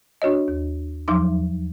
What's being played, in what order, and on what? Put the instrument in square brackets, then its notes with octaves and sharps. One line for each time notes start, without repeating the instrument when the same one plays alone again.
[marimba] D4 F#4 C#5 D#5
D#2
E2 F3 F#3 D#4 C6 D6